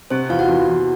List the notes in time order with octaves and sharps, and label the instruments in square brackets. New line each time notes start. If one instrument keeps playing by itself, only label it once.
[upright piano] C3 [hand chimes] C4 C5
[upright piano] E2 [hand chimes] F4 F5
[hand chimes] F#4 F#5
[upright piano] E2
E2